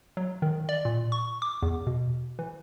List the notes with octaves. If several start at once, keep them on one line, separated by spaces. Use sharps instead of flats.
F#3
D#3
D5
A#2
C#6
D6
E2
B2
E3